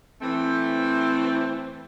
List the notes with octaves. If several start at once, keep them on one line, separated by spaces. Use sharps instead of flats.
E3 A3 C4